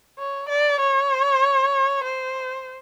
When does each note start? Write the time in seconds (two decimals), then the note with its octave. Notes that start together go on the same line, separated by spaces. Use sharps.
0.19 C#5
0.49 D5
0.81 C#5
2.04 C5